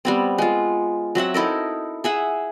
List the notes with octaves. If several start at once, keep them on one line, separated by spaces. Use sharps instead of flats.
G3 B3 C4
G#3 F4
F#3 C4 E5 F#5
D#4 E4 A4 A#4
G#4 E5 F#5